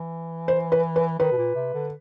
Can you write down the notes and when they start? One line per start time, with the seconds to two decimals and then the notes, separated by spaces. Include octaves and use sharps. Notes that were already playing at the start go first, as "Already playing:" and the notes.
Already playing: E3
0.48 C5
0.72 B4
0.96 B4
1.19 D#3 B4
1.32 B2
1.37 A#2
1.55 C3
1.74 D3